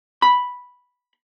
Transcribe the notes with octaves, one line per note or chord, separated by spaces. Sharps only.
B5